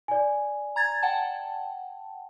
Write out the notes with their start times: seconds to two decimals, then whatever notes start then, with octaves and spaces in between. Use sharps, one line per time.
0.08 D5 G#5
0.76 A#5 G#6 A6
1.03 F#5 G5 A5